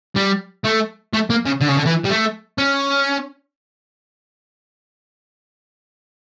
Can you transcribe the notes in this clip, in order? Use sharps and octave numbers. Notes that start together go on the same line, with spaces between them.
G3
A3
A3
A#3
C#3
D3
C#3
D3
E3
G3
A3
C#4